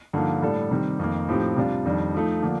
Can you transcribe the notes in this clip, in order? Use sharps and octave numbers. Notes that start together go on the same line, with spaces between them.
G2 D3 F3 A#3 D#4
A2 G3 D4 A4
C3 D#3 G3
F2 D#3 A#3
A2 F3 C4 D#4 G4
C3 G3 D4 F4
F2 D#3 G3 D4
F3 A3 D#4
D3 F3 A#3 D4